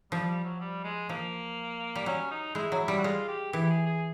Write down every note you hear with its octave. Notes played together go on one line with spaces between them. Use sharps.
F3 G3
G3
F#3
G3
G#3
F3 A#3
G3
F#3 C#4
D#4
G#3 E4
F#3
E4
G3
F#4
G#3 F4
G4
E3 G4
G4
G#4
G#4